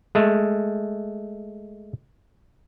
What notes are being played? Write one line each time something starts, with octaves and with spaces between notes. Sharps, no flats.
G#3 A3